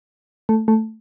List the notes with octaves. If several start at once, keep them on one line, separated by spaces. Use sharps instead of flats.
A3
A3